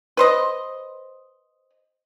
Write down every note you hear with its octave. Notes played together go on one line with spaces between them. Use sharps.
B4 C5 D#5